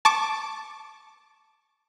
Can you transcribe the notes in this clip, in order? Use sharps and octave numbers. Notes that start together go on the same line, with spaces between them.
A5 C#6 D6